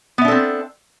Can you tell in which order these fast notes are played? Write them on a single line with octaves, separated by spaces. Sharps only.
B3 E5 D4 A4 C4